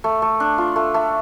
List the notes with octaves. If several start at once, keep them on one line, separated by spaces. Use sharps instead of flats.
A3
A3
D4
F4
A3
A3